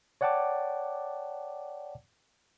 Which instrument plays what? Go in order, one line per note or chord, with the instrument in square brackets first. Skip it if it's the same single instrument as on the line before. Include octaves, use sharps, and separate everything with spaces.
[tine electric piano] C#5 D5 F#5 G5 A5 D6